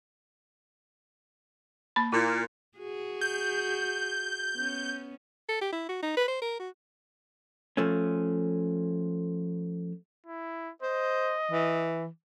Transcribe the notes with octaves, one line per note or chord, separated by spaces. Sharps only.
A#3 B5
A#2 E4
F#4 G#4
G6
B3 C#4
A4
G4
E4
F#4
D#4
B4
C5
A#4
F#4
F3 A3 C#4
E4
C5 D#5
E3